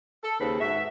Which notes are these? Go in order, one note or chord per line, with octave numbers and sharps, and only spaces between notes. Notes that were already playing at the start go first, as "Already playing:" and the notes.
A4
D#2 C#3 C4 G#4 B4
G#2 F#4 E5